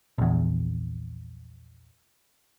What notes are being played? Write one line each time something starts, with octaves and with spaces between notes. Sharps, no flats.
A#1 E2